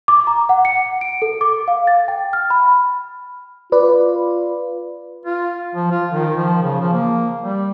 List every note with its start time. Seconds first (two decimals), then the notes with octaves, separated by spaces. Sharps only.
0.08 D6
0.27 A#5
0.49 F#5
0.65 C#7
1.01 D7
1.22 A4
1.41 D6
1.68 F5
1.87 A6
2.08 G5
2.33 F6
2.50 B5
3.72 F4 B4 D5
5.26 F4
5.75 F3
5.91 F4
6.11 D#3
6.37 F3
6.63 C#3
6.81 F3
6.93 A#3
7.41 G3